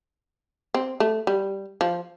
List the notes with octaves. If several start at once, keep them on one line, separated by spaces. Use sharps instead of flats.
C4
A3
G3
F3